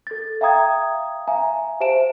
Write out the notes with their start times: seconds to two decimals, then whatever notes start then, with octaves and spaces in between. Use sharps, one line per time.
0.07 A4 A6
0.41 E5 F5 G5 A#5 D#6 G#6
1.27 E5 F5 G#5 A#5
1.80 G4 C5 E5 A5 D7 E7